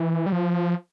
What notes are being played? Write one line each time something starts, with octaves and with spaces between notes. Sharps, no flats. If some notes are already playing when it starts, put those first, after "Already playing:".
Already playing: E3
G3
F3